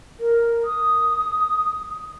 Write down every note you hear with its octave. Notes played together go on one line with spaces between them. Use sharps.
A#4
D#6